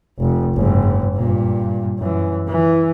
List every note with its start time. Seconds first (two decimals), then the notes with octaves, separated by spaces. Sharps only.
0.20 F1
0.55 F#1 G#2
1.16 G2 A#2
1.99 F#2 E3
2.48 E3